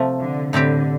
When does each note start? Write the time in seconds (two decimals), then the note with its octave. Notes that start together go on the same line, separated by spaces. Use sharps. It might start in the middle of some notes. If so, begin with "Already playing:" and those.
Already playing: C3 F3 A3
0.20 D3
0.53 A2 D3 G3 C4 G4